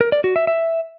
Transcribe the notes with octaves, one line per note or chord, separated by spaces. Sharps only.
A#4
D5
F#4
E5
E5